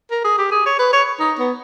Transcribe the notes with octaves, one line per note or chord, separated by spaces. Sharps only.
A#4
G#4
G4
G#4
C#5
B4
C#5
D#4
B3